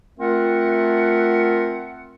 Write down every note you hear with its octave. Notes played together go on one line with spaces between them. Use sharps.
A3 C4 F4 A#4 E5 F#5